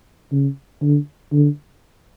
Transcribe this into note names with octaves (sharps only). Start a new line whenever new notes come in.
C#3
D3
D3